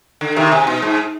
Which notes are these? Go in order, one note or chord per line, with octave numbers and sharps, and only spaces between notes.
D3
C3 D#3
C3
B2
G#2